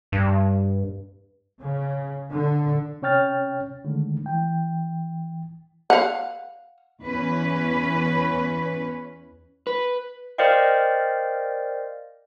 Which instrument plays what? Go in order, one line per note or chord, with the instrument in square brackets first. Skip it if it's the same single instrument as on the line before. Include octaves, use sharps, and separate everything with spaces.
[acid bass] G2
[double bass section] C#3
D3
[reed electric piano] C3 C#4 C#5 G5 F6 A6
D3 D#3 G#3 A3
E3 G5
[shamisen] F5 F#5
[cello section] E2 C#4 B4
[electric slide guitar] B4
[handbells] A#4 C5 D5 D#5 F5 G5